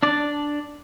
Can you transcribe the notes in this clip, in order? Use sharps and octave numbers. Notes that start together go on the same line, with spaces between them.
D4 D5